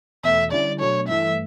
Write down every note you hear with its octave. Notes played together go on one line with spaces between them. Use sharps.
E2 B2 A3 E5
D3 G3 C#4 E4 D5
B2 F#3 A3 D4 C#5
G2 E3 A3 E5